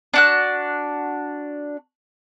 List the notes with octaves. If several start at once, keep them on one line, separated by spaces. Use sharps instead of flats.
D4 F#4 F#6